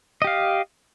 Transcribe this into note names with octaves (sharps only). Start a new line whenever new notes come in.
G4 D#5 F5